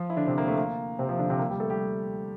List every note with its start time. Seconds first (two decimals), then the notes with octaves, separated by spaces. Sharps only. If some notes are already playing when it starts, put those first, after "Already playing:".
Already playing: F3 F4
0.10 E4
0.17 D3 D4
0.27 C3 C4
0.38 A#3
0.48 A3
0.58 A#3
0.99 C3 C4
1.09 F3 F4
1.19 D3 D4
1.29 C3 C4
1.39 A#3
1.50 G3 G4
1.60 A3 A4
1.70 G3 G4